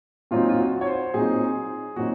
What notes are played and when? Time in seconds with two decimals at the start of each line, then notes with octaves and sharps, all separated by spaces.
0.31 A#2 F#3 C4 D#4 F4
0.49 F4
0.59 F#4
0.81 C#5
0.87 C5
1.14 A#2 F#3 C4 D#4 G#4
1.96 A#2 F#3 C4 D#4 F#4